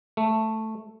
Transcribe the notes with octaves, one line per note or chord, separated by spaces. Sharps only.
A3